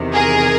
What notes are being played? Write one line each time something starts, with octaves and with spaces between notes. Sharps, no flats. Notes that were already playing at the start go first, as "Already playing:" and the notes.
Already playing: E2 C3 D#3
G#4 A#4